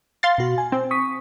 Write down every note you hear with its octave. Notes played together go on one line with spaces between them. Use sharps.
F5 C6 A6
B2 F#4
G#5
C4
C#6 D#6 B6